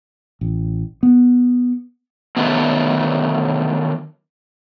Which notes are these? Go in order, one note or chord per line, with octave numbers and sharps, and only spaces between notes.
A1
B3
D3 D#3 F#3 A3 B3